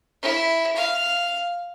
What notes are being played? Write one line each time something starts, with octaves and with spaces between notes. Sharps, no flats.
E4
F5